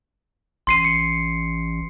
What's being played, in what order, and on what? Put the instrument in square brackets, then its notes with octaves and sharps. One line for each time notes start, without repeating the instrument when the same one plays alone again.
[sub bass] A1 [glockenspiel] C6 C7 D#7
[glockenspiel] C#7